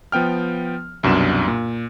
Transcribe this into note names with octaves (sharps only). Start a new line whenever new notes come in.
F3 B3 G5 F6
C2 F#2 B2 D4 E7
A#2